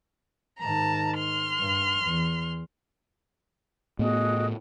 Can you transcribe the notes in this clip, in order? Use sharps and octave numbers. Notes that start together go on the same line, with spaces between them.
G#2 D#3 A5 A#5
C6 F6
G2
E2
A2 B3 F#4 G#4 D#5